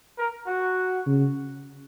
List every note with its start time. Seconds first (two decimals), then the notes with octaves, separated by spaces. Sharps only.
0.17 A#4
0.47 F#4
1.06 C#3